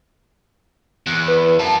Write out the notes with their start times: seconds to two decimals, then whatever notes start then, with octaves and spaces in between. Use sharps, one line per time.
1.07 E2 F#6
1.28 B4
1.60 F#4 A#4 A5